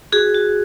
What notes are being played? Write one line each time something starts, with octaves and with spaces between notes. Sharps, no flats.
F#4 G#4
F#4